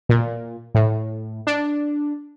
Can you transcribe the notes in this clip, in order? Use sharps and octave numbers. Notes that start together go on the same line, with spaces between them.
A#2
A2
D4